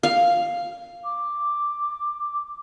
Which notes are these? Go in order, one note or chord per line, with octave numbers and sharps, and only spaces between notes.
F5
D6